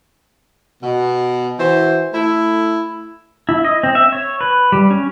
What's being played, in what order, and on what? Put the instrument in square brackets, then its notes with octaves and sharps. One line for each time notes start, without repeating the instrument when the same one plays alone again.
[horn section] B2
E3 F#4 C5
A3 E4
[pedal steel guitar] E4
D#5
C4
E5
C#5
B4
G3
C#4